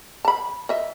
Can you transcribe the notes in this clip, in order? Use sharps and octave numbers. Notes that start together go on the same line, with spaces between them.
A5 B5
D#5 E5